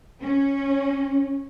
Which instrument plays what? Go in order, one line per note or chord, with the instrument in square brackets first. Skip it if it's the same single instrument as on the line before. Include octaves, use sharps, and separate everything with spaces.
[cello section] C#4